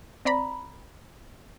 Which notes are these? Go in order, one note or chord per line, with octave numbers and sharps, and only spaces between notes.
C4 D5 A#5 B5